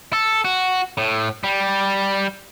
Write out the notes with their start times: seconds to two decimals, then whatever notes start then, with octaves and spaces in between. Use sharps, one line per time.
0.13 A4
0.45 F#4
0.98 A2
1.44 G3